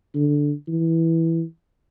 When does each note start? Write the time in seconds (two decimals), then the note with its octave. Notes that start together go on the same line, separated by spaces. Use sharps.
0.15 D3
0.68 E3